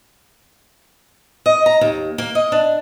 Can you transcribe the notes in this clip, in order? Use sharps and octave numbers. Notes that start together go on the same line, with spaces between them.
D#5
A#5
D#2
A#3
D#5
D4